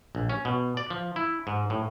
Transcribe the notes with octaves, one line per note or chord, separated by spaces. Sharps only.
A#1
C#4
B2
D5
F3
E4
G#2
A2